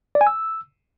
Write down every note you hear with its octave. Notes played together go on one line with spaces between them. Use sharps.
D5
G#5
E6